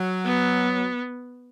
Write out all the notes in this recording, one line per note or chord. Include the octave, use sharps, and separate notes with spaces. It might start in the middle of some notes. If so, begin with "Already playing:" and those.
Already playing: F#3
B3